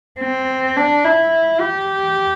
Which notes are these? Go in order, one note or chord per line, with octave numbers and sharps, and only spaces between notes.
C4
D4
E4
G4